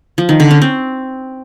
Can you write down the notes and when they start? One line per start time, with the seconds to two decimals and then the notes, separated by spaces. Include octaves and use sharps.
0.18 F3
0.29 D#3
0.40 D3
0.51 C#4
0.62 C4